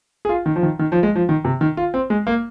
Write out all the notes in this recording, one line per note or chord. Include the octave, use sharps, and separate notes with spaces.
G#4
F4
D#3
F3
D#3
D#3
F3
G#3
F3
D#3
C3
D#3
F4
C4
G#3
A#3